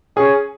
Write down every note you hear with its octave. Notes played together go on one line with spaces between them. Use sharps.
C#4 G#4